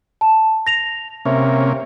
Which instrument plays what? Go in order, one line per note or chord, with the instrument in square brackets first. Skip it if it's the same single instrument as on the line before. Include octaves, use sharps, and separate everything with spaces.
[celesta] A5
A#6 F7
[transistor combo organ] C3 A#3 C#4 [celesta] E5